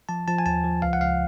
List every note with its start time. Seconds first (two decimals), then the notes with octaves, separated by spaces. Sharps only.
0.09 F3 A5
0.28 F3 A5
0.39 G#5
0.46 D#2 A5
0.64 F3
0.82 C#2 F5
0.93 F#5
1.01 C#2 F5